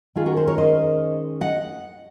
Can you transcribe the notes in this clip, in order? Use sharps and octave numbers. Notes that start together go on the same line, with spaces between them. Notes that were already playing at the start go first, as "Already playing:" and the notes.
D#3 G#3 C#4 F4 G#4
F#4 A#4
G#4 C5
A#4 C#5
C5 D#5
D#5 F#5